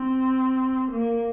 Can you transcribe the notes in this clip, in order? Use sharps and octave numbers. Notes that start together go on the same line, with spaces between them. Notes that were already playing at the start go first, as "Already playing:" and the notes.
Already playing: C4
A#3